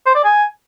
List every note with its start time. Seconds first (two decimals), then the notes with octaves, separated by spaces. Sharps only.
0.06 C5
0.15 D5
0.24 G#5